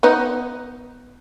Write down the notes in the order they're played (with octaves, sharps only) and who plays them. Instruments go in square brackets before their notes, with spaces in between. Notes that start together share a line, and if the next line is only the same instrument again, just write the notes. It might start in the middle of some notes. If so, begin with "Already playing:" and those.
[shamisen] B3 D#4